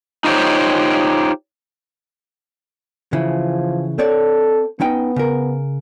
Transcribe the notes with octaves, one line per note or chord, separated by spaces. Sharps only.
D#4 F4 G4 C5 C#5
C#3 E3 F3
C4 A4 C#5 D5
B3 C#4 D#4 G5
C#3 A#4